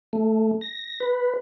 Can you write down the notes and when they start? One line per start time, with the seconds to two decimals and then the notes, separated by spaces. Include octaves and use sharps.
0.13 A3
0.61 A#6
1.00 B4